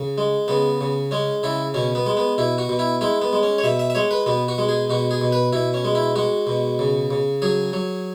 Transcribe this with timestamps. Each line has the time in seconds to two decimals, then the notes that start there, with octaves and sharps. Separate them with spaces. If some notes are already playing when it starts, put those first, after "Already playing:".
Already playing: C#3
0.18 G#3
0.48 C#3 B3
0.81 C#3
1.11 G#3 C#4
1.43 C#3 E4
1.74 B2 C#4
1.95 B3
2.06 G#3
2.17 B3
2.38 B2 E4
2.58 F#4
2.69 B2
2.79 E4
3.01 G#3 E4
3.22 B3
3.33 G#3
3.43 C#4
3.58 C#5
3.64 B2 E5
3.79 E5
3.90 E5
3.95 G#3 C#5
4.11 B4
4.26 B2 B3
4.48 F#4
4.58 G#3
4.69 G#4
4.90 B2 F#4
5.11 G#4
5.21 B2
5.32 B4
5.53 B2 E4
5.74 C#4
5.85 G#3
5.95 E4
6.16 G#3 F#4
6.47 B2
6.79 C#3
7.11 C#3
7.42 F#3 G#4
7.73 F#3